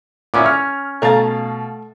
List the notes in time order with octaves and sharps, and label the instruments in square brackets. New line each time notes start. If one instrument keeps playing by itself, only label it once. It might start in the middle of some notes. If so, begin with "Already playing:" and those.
[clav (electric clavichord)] A#2 B3 C#4 [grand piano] E4 D6
[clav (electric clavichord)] C#4 [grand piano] F6
[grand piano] B2 F5 A6 [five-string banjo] A3 A#5